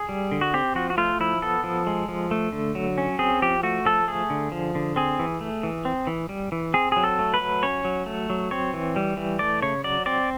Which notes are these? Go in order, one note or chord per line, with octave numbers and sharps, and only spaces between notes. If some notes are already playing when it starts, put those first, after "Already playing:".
Already playing: G#4
G3
D3
F#4
C4 G4
F3 F#4
F#4
A3 F4
F3 E4
B3 A4
F3
G#3
F3
A3
D3
F#3
C#4
C4 G#4
F3 G4
A3 F#4
F3 A4
A3 G#4
D3
F3
D3
C4 G#4
E3
A3
E3
C4
E3
G3
E3
C4 G#4
F#3 G#4
A4
A3
B4
F#3
C#4 C#5
F#3
A3
F#3
C4 C#5
E3
G3
E3
A3 D5
C#3 C#5
F#3 D5
C4 D5